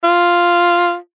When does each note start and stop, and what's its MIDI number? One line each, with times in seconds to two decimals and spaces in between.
0.04 0.95 65